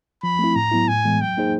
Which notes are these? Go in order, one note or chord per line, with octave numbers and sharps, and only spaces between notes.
F3 B5
A3 C4 E4
A2 A#5
F#3 B3 E4
A2 G#5
E3 G#3 B3
F#3 G5
A#3 D#4 G#4 C5